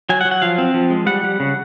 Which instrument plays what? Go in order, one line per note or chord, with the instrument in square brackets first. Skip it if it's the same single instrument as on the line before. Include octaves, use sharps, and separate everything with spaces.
[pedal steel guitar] F#3 G#5
F#5
F#3
F#5
F3 F5
C4
F3
G#3
G3 F#5
G3
C#3